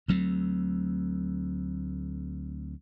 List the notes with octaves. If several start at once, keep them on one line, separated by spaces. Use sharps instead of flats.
D2 F#3 A3 C4